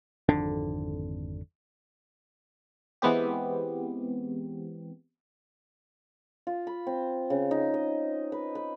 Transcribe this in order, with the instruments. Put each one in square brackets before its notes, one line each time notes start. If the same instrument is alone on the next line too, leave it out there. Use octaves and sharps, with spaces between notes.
[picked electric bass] G#1 F2 D3 D4
[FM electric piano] E3 G#3 B3 C4 G4
[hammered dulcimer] F4
B5
C4
C#3
D#4
D#5
B4
B4